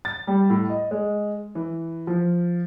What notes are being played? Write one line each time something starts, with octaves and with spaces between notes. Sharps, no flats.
A6
G3
A2
D#5
G#3
E3
F3